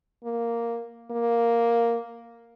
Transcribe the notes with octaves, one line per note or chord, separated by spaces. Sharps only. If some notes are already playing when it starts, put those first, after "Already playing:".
A#3
A#3